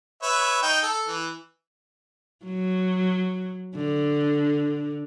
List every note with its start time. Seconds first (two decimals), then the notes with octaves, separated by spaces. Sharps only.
0.22 B4 C#5 E5
0.62 D#4 G5
0.83 A4
1.08 E3
2.46 F#3
3.76 D3